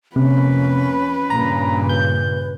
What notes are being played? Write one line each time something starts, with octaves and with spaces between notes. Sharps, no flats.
F2 C3 A#3 C#4 B4
G2 A#2 C#3 A#5
B4 G6